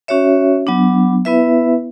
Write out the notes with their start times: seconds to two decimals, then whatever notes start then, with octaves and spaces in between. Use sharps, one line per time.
0.08 C#4 F#4 C#5 E5
0.67 F#3 B3 D4
1.25 B3 E4 B4 E5